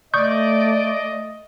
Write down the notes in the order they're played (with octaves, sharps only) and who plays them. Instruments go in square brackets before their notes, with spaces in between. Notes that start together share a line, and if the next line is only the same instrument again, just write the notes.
[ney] A3 [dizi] D5 [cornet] D#5 [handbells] C#6 D#6 G6